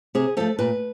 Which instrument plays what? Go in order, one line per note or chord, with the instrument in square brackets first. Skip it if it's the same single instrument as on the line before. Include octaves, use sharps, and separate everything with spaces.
[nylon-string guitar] C3 G#4
F3 A3 A4
A#2 B4